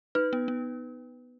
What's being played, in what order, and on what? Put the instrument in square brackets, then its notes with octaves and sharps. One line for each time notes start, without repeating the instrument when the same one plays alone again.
[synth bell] D#4 [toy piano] B4
[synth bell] B3
B3